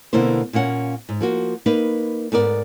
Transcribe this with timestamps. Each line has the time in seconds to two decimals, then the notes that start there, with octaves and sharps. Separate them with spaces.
0.13 B2 D3 A#3 B3 E4 C5
0.53 A#2 A#3 C#4 F#5
1.09 G#2
1.21 F3 A#3 F#4
1.66 A#3 D#4 B4
2.32 G#2 B3 A#4 D5